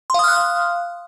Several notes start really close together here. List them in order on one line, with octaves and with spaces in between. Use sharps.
C6 F5 D#6 F6 F#6